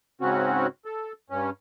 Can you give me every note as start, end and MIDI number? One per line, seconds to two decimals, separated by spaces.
0.21 0.67 44
0.21 0.67 49
0.21 0.67 60
0.21 0.67 61
0.21 0.67 66
0.85 1.12 69
1.30 1.50 43
1.30 1.50 61